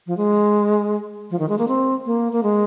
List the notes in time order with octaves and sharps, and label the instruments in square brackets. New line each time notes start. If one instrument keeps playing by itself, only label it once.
[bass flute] F3
G#3
F3
D#3
G#3
A#3
C4
A#3
A#3
G#3